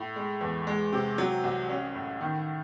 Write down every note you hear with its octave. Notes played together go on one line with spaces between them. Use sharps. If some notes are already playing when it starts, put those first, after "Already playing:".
Already playing: A2
G#3
E2
G#3
C3
F#3
C2
C#4
A2
D#3